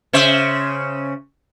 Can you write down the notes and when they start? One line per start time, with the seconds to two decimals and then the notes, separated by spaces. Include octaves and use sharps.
0.13 C#3 C5 E5